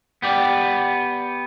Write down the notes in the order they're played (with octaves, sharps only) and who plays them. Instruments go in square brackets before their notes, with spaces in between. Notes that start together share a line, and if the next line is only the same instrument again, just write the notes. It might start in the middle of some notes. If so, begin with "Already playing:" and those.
[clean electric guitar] B3 G4 D5